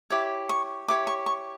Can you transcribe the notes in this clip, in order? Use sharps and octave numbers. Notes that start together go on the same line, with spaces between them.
E4 G4 C#5 D6
C#6
E4 G4 C#5 D6
C#6
C#6